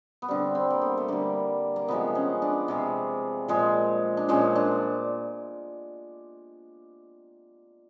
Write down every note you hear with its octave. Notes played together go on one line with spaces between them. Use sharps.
B3
D3 G3 C4
C4
A#3
B3
A3
D3 G3 A#3
A#3
C3 F3 G#3 B3
C#4
D4
C3 F3 G#3
A#2 F3 G#3
D4
A#2 F3 G#3 C#4
D4